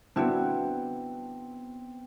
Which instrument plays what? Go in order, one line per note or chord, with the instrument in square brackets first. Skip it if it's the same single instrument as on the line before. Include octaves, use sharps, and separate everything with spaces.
[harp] B3 C4 [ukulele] D4 E4 F#4